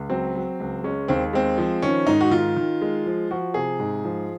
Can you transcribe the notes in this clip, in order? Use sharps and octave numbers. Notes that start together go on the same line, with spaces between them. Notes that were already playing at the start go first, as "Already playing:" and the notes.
Already playing: C#2
F#3 C4
F#3
C#2
G#3 C#4
D#2 C4
G#3 C4
F3
D#3 C#4
G#2 D#4
F#4
D#3 F4
D#3
G#3
F3
F3 F#4
C3 G#4
G#2
F3